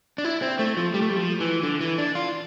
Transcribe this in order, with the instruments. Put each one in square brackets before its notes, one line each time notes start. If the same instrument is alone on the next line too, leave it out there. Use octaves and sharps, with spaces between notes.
[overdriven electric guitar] D4
E4
C4
A3
F3
G3
A3
G3
F3
E3
D3
E3
D4
F4